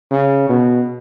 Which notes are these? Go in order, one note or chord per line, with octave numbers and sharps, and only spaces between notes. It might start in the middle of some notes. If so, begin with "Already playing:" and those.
C#3
B2